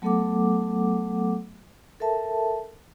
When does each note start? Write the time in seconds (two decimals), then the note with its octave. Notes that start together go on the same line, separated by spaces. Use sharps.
0.02 F#3 A3 B3 A4 F#5 D6
2.00 A4 A#4 E5 A5